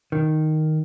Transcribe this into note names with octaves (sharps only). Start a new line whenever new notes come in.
D#3